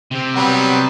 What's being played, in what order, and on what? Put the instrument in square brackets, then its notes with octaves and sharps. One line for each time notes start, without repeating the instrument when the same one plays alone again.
[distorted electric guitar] C3 C4
[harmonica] F#3 G3 B3